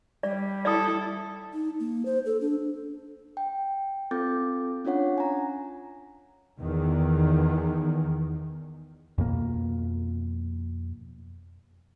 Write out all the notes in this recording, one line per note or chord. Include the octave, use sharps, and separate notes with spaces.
G3 D5
E4 A4 D5 D#6
D#4
A#3
C5
A4
D4
G5
C4 F4 A4 D6 G6 A6
C#4 D4 F4 C#5 F#5
G#5 A#5
E2 D#3
F2 B2 A#3